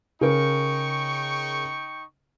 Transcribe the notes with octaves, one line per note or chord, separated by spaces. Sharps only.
C#3 D#4 A#4 G5 C#6